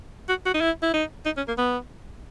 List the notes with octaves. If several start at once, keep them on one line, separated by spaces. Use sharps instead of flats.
F#4
F#4
D#4
E4
E4
D#4
D#4
C#4
A#3
B3